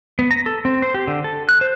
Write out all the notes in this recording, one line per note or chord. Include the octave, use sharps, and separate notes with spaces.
B3
A#5
A4
C4
C5
G4
D3
A4
F#6
C5